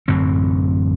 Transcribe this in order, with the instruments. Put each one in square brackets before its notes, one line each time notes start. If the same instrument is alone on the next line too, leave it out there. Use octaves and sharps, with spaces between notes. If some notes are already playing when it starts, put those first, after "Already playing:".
[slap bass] A1 F#2 D3 C4